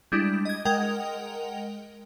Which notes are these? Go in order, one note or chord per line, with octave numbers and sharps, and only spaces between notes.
G3 G#3 D4 E4
D#5 G#6
G#3 A#4 D#5 F#5 G5 F7